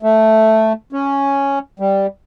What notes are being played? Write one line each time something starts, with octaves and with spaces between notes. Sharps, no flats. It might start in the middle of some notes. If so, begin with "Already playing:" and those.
A3
C#4
G3